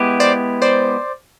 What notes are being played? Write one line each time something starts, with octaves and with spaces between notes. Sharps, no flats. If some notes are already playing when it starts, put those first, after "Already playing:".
Already playing: G#3 B3 E4 G4
C5 D5
C5 D5